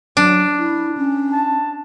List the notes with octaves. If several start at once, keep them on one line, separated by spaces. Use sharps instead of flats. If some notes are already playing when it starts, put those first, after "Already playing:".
F#3 D4
E4
C#4
A5